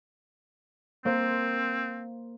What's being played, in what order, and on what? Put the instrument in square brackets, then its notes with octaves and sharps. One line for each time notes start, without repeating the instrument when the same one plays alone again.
[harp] A#3 C5 [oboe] C4